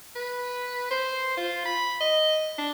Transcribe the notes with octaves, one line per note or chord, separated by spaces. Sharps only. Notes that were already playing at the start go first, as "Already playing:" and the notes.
B4
C5
F4
B5
D#5
D4